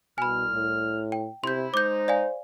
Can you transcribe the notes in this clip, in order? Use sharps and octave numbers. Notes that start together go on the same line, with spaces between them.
C2 B2 G#5 B5 F6
A2
G5
C3 E4 C6 G6
G#3 D#4 C5 D6 G6
D5 F5 G#5